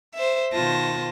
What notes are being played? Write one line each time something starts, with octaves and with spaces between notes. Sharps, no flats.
C5 E5
B2 D#3 F4 C5 A5 A#6